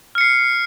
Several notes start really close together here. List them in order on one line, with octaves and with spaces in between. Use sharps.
F6 C#7 C7